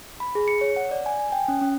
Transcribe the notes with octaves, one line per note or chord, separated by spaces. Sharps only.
B5
G#4
C#7
C#5
F#5
D5
G#5
G#5
G5
C#4
C#4